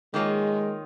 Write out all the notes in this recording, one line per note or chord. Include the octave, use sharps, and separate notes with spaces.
D#3 G#3 A#3 F4 A#4 C#5